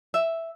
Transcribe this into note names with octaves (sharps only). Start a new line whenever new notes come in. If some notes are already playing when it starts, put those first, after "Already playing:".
E5